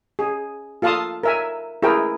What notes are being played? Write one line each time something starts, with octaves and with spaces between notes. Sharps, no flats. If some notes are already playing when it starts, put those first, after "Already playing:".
G#4
F4 A4 F5 A5 C6 D#6
A#4 E5 G#5
E4 G#4 A#4 G5